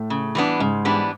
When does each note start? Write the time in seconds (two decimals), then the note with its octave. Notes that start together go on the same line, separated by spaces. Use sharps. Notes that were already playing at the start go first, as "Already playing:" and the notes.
Already playing: A2 A3
0.10 C#3
0.35 E3 G3 B3 D4
0.60 G#2 C#3 G#3
0.85 E3 G3 B3 D4